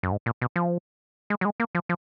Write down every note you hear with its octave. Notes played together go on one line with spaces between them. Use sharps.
F#2
G#2
A#2
B2
F3
G#3
F#3
G#3
A#3
F3
F3